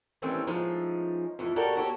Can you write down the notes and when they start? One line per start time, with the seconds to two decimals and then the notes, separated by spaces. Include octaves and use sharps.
0.22 D#3 E3 G3 A3 C4 C#4
0.47 F3 G#3 A3 C#4 D#4
1.39 F2 E3 A3
1.56 F#4 G4 A4 A#4 C#5 D5
1.76 F#4 G4 A4 C#5